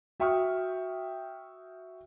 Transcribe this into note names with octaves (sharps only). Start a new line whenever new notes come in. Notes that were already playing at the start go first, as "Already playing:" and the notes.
F#4 E5 G5 C#6 D#6 F6